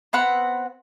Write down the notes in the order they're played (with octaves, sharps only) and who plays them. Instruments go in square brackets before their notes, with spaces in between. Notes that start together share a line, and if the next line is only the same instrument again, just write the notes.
[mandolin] B3 C4 F#5 B5